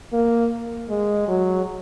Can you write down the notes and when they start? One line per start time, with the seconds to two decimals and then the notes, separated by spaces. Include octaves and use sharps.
0.13 A#3
0.90 G#3
1.28 F#3